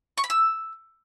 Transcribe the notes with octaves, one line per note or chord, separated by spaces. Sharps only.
C#6
B5
E6